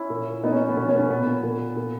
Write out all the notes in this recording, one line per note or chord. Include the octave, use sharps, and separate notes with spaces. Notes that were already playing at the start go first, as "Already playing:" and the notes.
Already playing: C#4 E4
A#2
A#2 B3 D#4
C#4
B3
B2 C#4
C#4
B3
C#4
A#2 B3
A#2
A#2